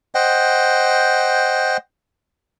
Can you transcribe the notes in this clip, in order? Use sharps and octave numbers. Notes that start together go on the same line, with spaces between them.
C5 D#5 F#5 G5